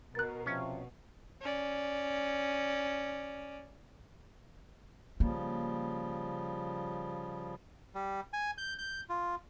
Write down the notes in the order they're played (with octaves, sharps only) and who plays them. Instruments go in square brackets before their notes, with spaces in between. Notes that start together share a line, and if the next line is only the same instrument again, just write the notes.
[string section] B2 [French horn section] A#4 [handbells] F#6 A6
[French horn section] C3 F3 [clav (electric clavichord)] C#4
[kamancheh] C#4 D5
[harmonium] C#3 F3 G3 [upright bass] A#3
[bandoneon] G3
G#5
G6
G6
F4